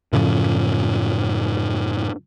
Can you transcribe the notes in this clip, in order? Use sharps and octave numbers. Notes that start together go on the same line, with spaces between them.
F#2 A2 C#3 F3